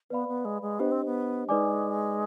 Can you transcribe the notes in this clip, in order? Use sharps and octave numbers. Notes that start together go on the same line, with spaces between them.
B3 B4 D5 F5 B5
B3
G#3
G#3
B3 D4 G4 C5 D#5
C4
B3
G#3 D#4 B4 D5 G#5 D6